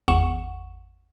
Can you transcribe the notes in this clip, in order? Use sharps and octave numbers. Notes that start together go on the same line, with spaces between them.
G#1 E2 F#5 C#6 E7